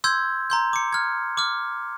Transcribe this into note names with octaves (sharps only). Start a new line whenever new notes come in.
C6 E6 G6 G#6
A#5 C6 G6
D6 C#7
F6 G#6
D6 F6